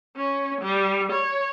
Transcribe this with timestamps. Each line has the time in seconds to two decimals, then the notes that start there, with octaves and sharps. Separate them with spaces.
0.17 C#4
0.62 G3
1.13 C#5